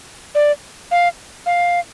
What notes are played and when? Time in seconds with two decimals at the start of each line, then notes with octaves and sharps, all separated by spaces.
0.35 D5
0.91 F5
1.46 F5